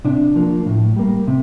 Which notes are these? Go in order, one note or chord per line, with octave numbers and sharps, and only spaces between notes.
C3 D4
F3 A#3
A2
G3 A#3
C3